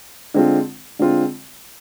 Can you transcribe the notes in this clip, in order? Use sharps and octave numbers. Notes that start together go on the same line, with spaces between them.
D3 G#3 C4 F4
D3 G#3 C4 F4